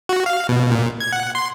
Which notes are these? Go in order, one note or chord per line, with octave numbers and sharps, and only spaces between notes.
F#4
F5
B2
A#2
G#6
F#5
C6